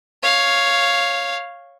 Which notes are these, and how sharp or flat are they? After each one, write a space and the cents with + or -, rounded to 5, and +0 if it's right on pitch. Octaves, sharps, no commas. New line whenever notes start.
C#5 +0 F5 +0